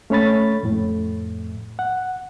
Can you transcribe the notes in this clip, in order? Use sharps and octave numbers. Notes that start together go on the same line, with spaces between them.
A3 C#4 C#5 B5 A6
F2 A2
F#5